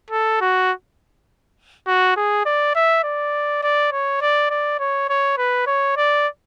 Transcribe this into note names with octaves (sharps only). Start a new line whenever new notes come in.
A4
F#4
F#4
G#4
D5
E5
D5
D5
C#5
D5
D5
C#5
C#5
B4
C#5
D5